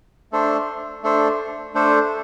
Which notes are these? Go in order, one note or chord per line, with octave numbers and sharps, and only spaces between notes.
A3 D4 A4 C5
A3 D4 A4 C5
A3 D4 A4 C5